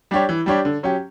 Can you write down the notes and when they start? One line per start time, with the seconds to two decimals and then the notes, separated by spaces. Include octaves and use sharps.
0.11 G3 D4 G4 C#5
0.29 E3
0.46 G3 D4 G4 C#5
0.65 D3
0.83 F#3 C#4 G4